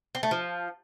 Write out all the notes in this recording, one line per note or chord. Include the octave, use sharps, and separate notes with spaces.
C4
A3
F3